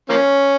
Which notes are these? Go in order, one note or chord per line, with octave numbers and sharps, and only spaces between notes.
F3 A#3 C#4